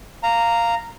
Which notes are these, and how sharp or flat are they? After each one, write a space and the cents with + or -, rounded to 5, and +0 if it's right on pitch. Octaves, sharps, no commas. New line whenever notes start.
F5 -5 A#5 -10